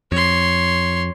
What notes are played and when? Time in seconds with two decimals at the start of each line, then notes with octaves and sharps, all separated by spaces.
0.12 F2 C#5 C6